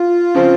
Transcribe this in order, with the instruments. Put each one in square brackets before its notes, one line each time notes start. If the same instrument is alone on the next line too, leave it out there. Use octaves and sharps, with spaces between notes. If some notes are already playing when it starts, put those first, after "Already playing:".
Already playing: [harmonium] F4
[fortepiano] C#3 F3 C4